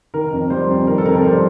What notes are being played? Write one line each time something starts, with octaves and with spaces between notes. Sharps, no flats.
D#3 A#4
F2
G3 C5
F2
D#3 A#4
A4
F2 A#4
A#4
G3 C5